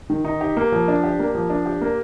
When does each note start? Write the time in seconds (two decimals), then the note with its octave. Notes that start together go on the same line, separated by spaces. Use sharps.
0.10 D#3
0.25 D#4
0.41 G4
0.57 A#3
0.72 F3
0.88 D4
1.04 G4
1.19 A#3
1.35 F3
1.50 D4
1.66 G4
1.81 A#3